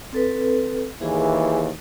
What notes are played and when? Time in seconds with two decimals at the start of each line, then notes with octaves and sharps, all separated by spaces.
0.13 C4 A4 B4
1.01 D#2 E3 G#4 G#5